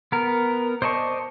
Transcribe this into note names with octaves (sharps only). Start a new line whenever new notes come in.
B3 A#4
C5 D5 D#5 A5 C#6